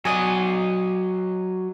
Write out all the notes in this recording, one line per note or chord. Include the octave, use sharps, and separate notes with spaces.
F#3 D5 D#5 F#5 G#5